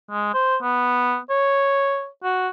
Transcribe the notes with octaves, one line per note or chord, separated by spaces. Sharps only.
G#3
C5
B3
C#5
F#4